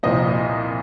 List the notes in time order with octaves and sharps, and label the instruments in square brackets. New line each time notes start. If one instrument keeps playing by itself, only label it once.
[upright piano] C2 A#2 F3 C4 D#5